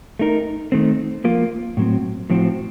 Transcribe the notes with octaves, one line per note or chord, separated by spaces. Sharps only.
A3 D#4 A#4
D#3 A3 C4
F3 A#3 F4
A2 F#3 C4
A2 F3 C4 F#4 C5